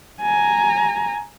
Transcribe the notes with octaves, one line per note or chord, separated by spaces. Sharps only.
G#5 A#5